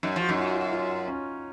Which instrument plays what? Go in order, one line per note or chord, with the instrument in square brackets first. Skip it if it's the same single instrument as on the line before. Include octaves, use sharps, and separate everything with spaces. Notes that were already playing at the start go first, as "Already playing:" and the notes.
[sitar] F#2 [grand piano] D#4
[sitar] F3 [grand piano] F#4
[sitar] F#2 [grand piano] D#4
[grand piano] F4
F4
F4
C#4